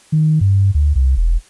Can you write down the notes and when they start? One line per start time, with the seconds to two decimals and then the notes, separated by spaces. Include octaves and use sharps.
0.12 D#3
0.41 G2
0.74 D2
0.95 C2
1.17 E1